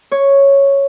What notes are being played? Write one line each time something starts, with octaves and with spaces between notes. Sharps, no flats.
C#5